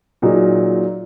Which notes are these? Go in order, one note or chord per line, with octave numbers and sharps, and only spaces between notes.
A#2 F#3 D#4 G#4